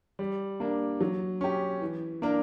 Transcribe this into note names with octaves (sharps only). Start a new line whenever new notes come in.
G3
A#3 D4
F#3
C#4 G4
E3
A#3 D4 A#4